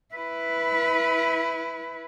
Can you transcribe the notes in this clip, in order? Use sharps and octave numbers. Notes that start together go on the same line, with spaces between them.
E4 B4